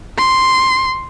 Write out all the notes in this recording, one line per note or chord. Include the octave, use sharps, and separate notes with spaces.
C6